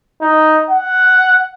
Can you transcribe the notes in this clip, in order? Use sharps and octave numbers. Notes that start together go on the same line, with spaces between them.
D#4
F#5